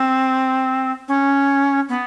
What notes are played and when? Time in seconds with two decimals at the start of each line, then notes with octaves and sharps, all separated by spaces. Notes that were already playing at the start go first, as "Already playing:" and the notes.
Already playing: C4
1.08 C#4
1.89 B3